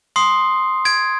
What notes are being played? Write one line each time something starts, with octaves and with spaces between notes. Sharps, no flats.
C6 D#6 C7
G#6 D7